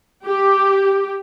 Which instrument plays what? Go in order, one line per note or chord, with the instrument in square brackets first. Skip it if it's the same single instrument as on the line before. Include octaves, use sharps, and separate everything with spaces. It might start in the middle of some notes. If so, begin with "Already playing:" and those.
[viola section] G4